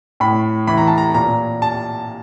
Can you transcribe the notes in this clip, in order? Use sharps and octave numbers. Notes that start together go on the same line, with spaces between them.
A2 B5
E3 B5
A#5
A5
A#5
A#2 A#5
A5